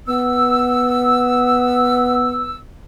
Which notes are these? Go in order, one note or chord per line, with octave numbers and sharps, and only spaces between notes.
B3 E6